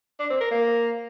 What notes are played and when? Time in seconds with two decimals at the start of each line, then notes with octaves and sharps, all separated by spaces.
0.19 D4
0.30 C4
0.40 A#4
0.51 A#3